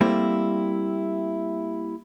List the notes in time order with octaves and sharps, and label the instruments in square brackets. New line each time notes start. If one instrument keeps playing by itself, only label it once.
[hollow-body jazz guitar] G3 A3 A#3 C4 E4